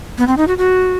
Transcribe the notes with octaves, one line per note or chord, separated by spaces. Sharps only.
B3
C4
D#4
F#4
F#4